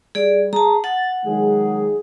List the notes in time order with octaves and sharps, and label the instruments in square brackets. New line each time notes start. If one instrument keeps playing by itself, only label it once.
[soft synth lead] G3 [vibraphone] G#4 D5
[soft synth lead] G#4 [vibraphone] A5 A#5
[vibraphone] F#5 [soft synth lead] A6
[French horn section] D#3 F#3 G#3 [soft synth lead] G#4